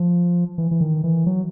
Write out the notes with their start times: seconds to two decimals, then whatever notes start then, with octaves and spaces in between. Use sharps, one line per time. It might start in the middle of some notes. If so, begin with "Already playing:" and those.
Already playing: F3
0.58 E3
0.71 E3
0.81 D#3
1.04 E3
1.26 F#3